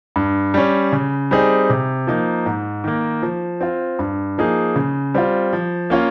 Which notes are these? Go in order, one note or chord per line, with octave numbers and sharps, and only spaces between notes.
G2
G3 C#4
C#3
G3 C4 D#4 G#4
C3
F3 A#3 D#4
G#2
D#3 A#3
F3
C4 F4
G2
F3 A#3 D#4 G#4
C#3
G3 C4 F4
F3
A#3 C#4 F4